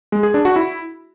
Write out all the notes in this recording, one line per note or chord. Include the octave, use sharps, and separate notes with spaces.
G#3
G#4
D4
F#4
E4